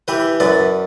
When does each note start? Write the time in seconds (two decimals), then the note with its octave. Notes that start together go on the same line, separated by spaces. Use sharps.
0.08 E3 G4 B4
0.40 F#2 B4 D5